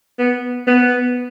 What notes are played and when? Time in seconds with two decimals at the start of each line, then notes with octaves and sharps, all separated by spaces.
0.19 B3
0.67 B3